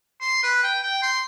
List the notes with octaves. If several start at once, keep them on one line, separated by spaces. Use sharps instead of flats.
C6
B4
G5
G5
C6